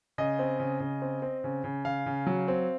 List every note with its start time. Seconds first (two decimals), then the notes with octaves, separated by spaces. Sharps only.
0.18 C#3 D#5
0.39 C4
0.59 C#3
0.80 C#3
1.02 C4
1.22 C4
1.44 C#3
1.64 C#3
1.85 C#3 F5
2.06 C#3
2.26 F#3
2.48 C4